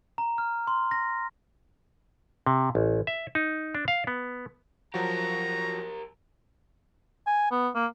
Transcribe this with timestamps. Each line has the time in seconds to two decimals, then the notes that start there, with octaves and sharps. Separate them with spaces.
0.18 A#5
0.38 F6
0.67 C6
0.91 A#6
2.46 C3
2.75 A1
3.07 E5
3.35 D#4
3.75 D4
3.88 F5
4.07 B3
4.94 F3 F#3 F#4 G4 A#4 A#5
7.27 G#5
7.51 B3
7.75 A#3